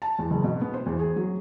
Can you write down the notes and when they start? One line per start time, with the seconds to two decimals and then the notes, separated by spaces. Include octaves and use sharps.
0.02 A5
0.19 E2
0.30 F#1
0.44 B2
0.61 B3
0.74 C5
0.86 E2
0.99 G#4
1.16 F#3